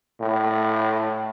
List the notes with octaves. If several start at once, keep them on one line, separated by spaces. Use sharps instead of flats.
A2